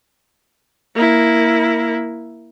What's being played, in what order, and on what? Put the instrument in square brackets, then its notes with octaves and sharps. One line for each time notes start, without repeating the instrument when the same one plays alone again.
[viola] A#3 E4